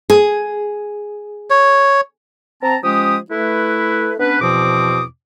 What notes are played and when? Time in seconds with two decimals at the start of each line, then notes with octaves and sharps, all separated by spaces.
0.10 G#4
1.50 C#5
2.63 C4 A5 A#5
2.84 F3 G#3 C#4 G4 D#6
3.31 A3 E4 B4
4.20 B3 C#4 D4 B4
4.41 E2 B2 F3 C4 D6 D#6